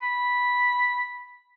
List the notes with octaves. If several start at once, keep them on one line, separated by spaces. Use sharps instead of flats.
B5